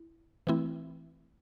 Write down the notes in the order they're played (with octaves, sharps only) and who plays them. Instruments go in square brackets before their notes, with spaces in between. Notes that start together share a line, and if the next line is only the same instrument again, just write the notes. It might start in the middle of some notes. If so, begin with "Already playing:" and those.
Already playing: [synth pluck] E4
E3 A3 C4 E4